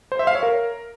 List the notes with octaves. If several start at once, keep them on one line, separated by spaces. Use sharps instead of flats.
C5
E5
F5
C#5
A#4